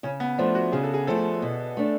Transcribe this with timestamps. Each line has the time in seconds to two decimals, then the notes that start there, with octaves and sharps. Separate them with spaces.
0.03 C#3 C#4
0.20 B3
0.38 F3 A3 D4
0.55 F#4
0.72 C#3 G#4
0.84 A4
0.94 G#4
1.07 F3 A3 A4
1.42 B2
1.77 A3 D4